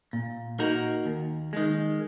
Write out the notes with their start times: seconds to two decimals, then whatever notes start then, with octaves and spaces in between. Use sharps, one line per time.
0.13 A#2
0.59 A#3 D#4 F#4 A#4
1.05 D#2
1.53 D#3 G#3